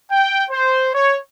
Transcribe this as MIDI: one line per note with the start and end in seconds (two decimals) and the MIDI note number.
0.11 0.44 79
0.51 0.90 72
0.93 1.17 73